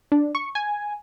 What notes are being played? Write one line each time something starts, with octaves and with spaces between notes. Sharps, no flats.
D4
C#6
G#5